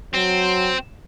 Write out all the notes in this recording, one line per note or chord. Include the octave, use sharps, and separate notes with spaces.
F#3 C4